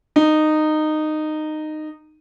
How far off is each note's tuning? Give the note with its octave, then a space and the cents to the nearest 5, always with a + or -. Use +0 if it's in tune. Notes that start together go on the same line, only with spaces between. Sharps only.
D#4 -15